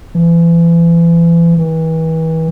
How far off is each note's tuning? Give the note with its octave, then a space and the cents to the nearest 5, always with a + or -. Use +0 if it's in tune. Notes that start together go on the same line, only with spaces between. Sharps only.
E3 +35
E3 -35